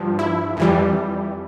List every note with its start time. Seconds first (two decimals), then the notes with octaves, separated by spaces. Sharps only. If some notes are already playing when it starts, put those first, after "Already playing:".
Already playing: G2 F3
0.19 E4
0.57 F2 E3 G3